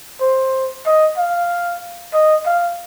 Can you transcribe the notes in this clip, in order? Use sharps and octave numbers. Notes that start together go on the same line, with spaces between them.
C5
D#5
F5
D#5
F5